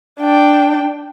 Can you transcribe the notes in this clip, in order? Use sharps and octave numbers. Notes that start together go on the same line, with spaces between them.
D4 G5